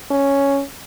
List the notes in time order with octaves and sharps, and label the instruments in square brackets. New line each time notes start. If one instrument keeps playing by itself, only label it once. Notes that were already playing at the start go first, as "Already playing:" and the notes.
[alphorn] C#4